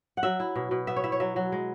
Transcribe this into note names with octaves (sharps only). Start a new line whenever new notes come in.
F#5
F#3 E5
E4
B2
B2
B3 E5
C#5
E4 E5
C#5
F#3 E5
F#3
G#3